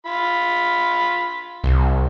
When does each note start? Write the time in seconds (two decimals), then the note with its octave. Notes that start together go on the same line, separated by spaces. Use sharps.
0.06 F4 B5
1.64 C2